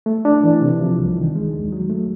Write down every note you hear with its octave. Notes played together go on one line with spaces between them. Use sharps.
A3
D4
E3
C3
F3
C2
D#3
G#3
D#2
F#3
A3